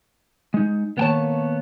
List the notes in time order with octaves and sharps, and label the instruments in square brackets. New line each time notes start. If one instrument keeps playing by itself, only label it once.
[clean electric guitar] G#3 D#4
[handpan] D#3 A#3 C#5 [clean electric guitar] B3 G5 A5